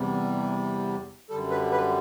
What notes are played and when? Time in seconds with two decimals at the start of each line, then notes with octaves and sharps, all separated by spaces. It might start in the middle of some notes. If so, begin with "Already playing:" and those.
Already playing: E2 C3 G3
1.30 F#2 D3 G3 A4
1.50 B4
1.72 B4